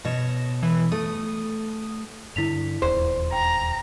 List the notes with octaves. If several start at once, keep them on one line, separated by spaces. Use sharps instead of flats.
B2 C#5 A#6 E7
E3
A3 D#6
G2 D3 E4 B6 F7
D#1 E2 C5
G5 A#5